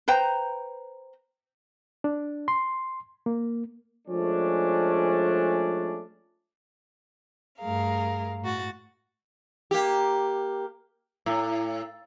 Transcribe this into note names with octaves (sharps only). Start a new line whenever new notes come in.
B4 C5 G5 A#5
D4
C6
A#3
F3 G#3 A3 C#4 D4
G2 A3 G#4 A#4 F5
A2 F#4 A6
A#3 G4
A2